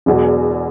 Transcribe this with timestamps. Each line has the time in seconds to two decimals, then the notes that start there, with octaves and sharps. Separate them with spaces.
0.06 E1 E2 B2 F#3